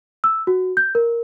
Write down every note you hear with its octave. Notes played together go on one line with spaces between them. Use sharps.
E6
F#4
G6
A#4